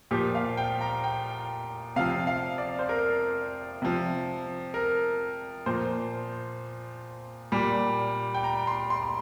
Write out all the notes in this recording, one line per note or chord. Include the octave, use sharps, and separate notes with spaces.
A#2 F3 G4
F5
G5
A#5
G5
C3 F3 F5
F5
D5
C5
A#4
C3 F3
A#4
A#2 F3 C5
A#2 G3
G5
A#5
C6
C6
C6